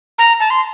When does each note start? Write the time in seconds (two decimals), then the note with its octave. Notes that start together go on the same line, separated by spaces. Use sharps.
0.19 A#5
0.40 A5
0.50 C6